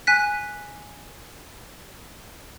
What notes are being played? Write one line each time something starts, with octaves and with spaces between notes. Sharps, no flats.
G#5 F#6 B6